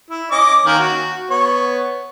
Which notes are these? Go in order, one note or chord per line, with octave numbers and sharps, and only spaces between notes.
E4
C#4 D#5 D6
D#3 A#3 C#4
F#4
B3 C#5